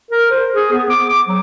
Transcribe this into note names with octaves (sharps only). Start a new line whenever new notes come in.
A#4
C5
G#4
B3
D6
D6
F#3